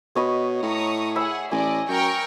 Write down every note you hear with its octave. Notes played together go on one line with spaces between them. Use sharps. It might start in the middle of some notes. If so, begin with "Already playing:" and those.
B2 C#5 D#5 B5
A2 A#5 C#6 D#6
G#4 E5 F#5 B5
A1 D5 D#5 G#5
F#2 A#4 G5 C#6